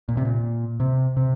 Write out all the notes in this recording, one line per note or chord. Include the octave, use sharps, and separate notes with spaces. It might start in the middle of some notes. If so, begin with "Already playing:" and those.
A#2
C3
A#2
C3
C3